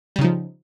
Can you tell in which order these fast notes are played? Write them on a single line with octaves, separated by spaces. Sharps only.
G3 C#3 D#4 F3